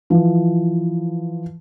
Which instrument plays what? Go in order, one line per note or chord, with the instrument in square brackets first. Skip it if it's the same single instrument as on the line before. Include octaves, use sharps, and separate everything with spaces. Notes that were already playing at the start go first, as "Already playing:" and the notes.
[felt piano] E3 F3